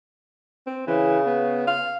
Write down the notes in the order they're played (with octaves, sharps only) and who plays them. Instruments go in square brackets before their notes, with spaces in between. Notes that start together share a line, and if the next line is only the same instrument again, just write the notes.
[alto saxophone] C4
[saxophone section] C#3 [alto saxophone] E3
[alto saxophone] B3
F5